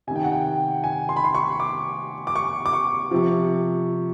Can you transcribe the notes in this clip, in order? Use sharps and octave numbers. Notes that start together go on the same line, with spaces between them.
C3 D#3 G5 G#5
F#5
G5
G#5
C6
B5
C6
C#6
D6
D6
C#6
D6
C#6
C3 F3